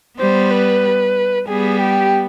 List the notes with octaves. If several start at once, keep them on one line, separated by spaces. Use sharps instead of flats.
G3 B3 C5
B4
G3 B3 G#4
G4